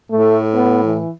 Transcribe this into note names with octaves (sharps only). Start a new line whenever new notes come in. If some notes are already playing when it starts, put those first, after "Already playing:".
A2 A3
B3
E3